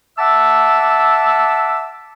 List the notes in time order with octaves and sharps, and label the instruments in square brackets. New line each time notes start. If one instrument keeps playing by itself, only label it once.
[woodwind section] E5 F#5 A5 D6 E6